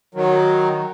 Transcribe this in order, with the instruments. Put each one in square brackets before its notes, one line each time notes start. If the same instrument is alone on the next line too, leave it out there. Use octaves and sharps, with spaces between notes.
[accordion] D#3 F#3